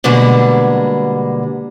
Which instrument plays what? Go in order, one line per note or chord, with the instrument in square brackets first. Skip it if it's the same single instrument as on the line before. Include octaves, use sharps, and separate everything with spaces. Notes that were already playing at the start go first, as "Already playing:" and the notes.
[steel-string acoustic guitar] B2 D3 G3 G#3 A#3